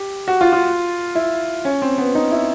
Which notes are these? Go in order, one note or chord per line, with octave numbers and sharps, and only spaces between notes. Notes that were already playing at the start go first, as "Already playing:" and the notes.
Already playing: G4
F#4
F4
F4
E4
C#4
C4
B3
D#4
E4